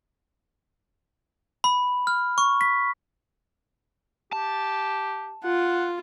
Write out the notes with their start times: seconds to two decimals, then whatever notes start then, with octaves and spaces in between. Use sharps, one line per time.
1.64 B5
2.07 F6
2.38 C#6
2.61 B6
4.33 G4 A5
5.44 F4 F#5